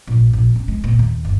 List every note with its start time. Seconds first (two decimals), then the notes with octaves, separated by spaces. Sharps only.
0.08 A#1
0.33 A#1
0.56 C#4
0.68 G#3
0.84 A#2
0.99 D#2
1.25 G1